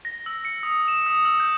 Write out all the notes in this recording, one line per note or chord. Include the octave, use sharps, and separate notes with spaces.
A#6
E6
C#7
D#6
E7
D#6
E6
G6